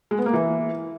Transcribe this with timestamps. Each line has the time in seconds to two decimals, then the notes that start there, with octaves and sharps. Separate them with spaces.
0.11 G#3
0.18 B3
0.26 A#3
0.33 E3